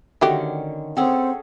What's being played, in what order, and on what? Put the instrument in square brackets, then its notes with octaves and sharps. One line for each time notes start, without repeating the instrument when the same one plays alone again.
[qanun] D3 D#3 C#4 [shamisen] A3 F#4 G4
[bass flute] C4 [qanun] C#4 G#4 A4 [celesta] F#5 G5 E6